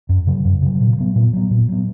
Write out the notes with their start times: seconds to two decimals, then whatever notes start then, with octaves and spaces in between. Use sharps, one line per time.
0.09 F#2
0.27 C#3 F#3
0.44 F#2
0.62 C#3 F#3
0.80 A#2
0.98 F#3 B3
1.16 A#2
1.33 F#3 B3
1.51 A#2
1.68 F#3 B3